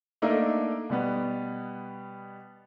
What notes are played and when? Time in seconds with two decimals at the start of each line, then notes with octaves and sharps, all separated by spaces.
0.22 A3 A#3 D4 D#4 A#4 E5
0.90 B2 G3 B3